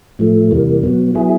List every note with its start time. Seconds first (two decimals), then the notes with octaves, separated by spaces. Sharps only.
0.19 A2 F3 A3
0.51 E2 C3 E3 G3 A#3
0.83 B2 F#3 B3
1.15 F#3 B3 E4 G#4